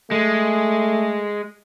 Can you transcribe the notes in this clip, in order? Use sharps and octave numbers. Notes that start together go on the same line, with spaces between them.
G#3 A3